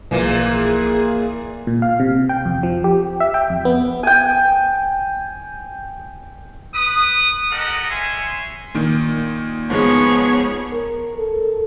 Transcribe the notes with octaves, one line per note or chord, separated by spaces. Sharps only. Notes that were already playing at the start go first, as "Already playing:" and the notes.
B1 A#2 E3 F3 A#3 G#4
A#2
F5
C3
G5
F2
F3
G4
E5
G5
F2
B3
G5 G#5
B4 D#6
G4 A4 A#4 D#5 F#5
C#5 E5 G#5 C6
A#2 D#3
G#2 F3 G#3 B3 G#4 C#5
A#4
A4